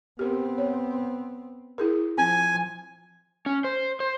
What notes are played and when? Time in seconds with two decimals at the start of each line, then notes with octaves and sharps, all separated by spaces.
0.19 B3 C4 G4 A#4
0.58 C#5
1.78 E4 G#4 A#4
2.18 F3 C4 G#5
3.46 C#4
3.64 C5
4.00 C5